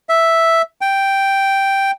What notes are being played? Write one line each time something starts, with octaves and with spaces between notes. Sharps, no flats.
E5
G5